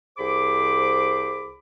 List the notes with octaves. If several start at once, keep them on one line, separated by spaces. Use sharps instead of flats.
C2 G#4 C5 B5 D6